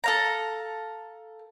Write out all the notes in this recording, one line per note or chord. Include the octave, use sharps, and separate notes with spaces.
A4 F5 A#5